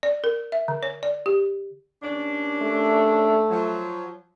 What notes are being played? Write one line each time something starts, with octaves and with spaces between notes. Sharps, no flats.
D5
A#4
E5
D3
C#5
D5
G4
D#2 C#4 D4
A3
F3 F#3